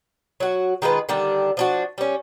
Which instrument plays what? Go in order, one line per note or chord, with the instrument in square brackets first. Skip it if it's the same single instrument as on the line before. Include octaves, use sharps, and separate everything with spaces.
[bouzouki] F#3 F#4
D#3 G#3 F4 B4
D3 D#3 G3 D4
F3 D4 F#4
G3 C#4